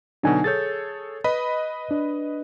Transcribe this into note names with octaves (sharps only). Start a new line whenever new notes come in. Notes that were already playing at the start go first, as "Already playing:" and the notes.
B2 D3 F#3 D4 D#4 G#5
G#4 A4 C#5 G6 A6
B4 D#5 B5
D4